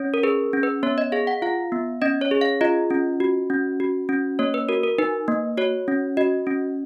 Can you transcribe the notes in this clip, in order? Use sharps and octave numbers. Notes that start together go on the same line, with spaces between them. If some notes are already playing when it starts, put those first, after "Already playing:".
Already playing: C#4 C#5
A#4
G#4 B4
C#4
B4
B3 C#5
D#5
G#4 F5
F#5
F4 F5
B3
C#4 D#5
C#5
G#4
F5
F4 D#5
C#4
F#4
C#4
F#4
C#4
A#3 C#5
B4
F#4 A#4
A#4
D#4 B4
A#3
F#4 C#5
C#4
F#4 D#5
C#4